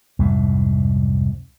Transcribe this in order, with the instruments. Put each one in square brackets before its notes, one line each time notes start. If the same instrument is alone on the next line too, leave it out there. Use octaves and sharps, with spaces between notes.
[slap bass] C2 F2 G#2